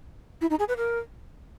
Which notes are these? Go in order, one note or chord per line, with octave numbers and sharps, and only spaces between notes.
E4
D#4
G#4
B4
A#4